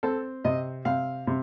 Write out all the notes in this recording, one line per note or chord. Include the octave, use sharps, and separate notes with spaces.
C4 A4
C3 D#5
C3 F5
C3